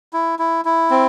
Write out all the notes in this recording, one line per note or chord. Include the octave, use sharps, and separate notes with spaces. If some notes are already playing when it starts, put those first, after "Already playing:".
E4
E4
E4
C4